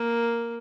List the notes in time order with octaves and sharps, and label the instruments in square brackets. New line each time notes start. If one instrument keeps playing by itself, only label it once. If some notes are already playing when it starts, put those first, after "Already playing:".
Already playing: [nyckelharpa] A#3